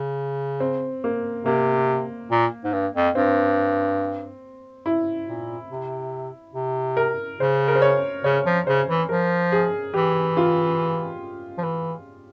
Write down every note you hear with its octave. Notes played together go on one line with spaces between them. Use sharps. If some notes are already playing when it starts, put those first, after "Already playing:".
Already playing: C#3
C4
A#3
C3 A#3
A#2
G#2
G2
F2
G2 C4
E4
A#2
C3
C3
A#4
C#3 C5
A#4
C5
C#5
C#3 C#5
F3
C#3 C5
E3
F3 A#4
G#4
E3 G4
F4
F3
E3